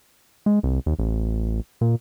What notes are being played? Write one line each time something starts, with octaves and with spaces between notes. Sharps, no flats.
G#3
C2
D#2
A1
A#2